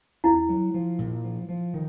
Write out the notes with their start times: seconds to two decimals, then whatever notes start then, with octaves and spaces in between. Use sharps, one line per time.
0.24 E2 E4
0.49 F#3
0.74 F3
0.99 A#2
1.24 F3
1.49 F3
1.74 D#3